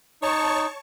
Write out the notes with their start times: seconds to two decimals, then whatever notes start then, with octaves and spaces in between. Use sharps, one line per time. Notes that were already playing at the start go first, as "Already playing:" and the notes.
0.22 D#4 C#5 A5 C#6